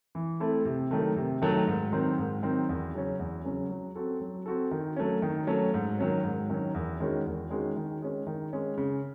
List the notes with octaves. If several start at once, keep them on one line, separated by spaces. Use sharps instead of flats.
E3
A3 C4 E4 A4
C3
D#3 F#3 A3
C3
D#3 F#3 A3
G#2
D#3 F#3 C4
G#2
D#3 F#3 C4
E2
C#3 F#3 C#4
E2
C#3 F#3 C#4
F#3
C4 F#4 A4
F#3
C4 F#4 A4
D#3
F#3 A3 C#4
D#3
F#3 A3 C#4
G#2
D#3 F#3 C#4
G#2
D#3 F#3 C#4
E2
D#3 G#3 C#4 F#4
E2
D#3 G#3 C#4 F#4
D#3
G#3 C#4
D#3
G#3 C#4
C#3